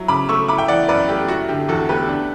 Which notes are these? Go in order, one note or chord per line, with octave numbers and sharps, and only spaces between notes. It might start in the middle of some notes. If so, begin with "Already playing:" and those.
Already playing: F#3 E4
C#3 B5 D6
A3 C#6 E6
E4 B5 D6
E5 G5
E3 D5 F#5
F#2 B4 D5
A3 G4
E4 F#4
D3 G4
E2 F#4 A4
A3 G4 B4
D4